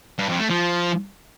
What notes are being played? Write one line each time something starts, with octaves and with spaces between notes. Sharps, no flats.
G2
F2
A3
F3